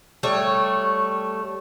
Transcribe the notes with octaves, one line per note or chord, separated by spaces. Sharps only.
G3 A3 C#5